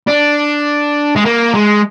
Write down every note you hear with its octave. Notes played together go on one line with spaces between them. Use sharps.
D4
G#3
A#3
G#3